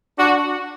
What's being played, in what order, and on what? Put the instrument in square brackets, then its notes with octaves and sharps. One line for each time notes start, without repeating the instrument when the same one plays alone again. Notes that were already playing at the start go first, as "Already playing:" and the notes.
[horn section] D4 F#4